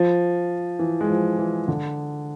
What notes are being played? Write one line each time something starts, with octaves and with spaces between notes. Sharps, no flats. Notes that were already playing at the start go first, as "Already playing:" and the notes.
Already playing: F3
E3
G#3
F3
E3
D3